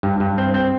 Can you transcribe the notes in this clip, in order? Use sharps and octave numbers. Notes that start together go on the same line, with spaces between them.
G2
G2
C4
C4